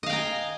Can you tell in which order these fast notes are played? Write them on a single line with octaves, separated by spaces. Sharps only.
D#5 F5 G5 A#5 G#5